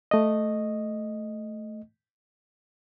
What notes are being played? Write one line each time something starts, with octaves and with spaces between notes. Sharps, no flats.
A3 D#5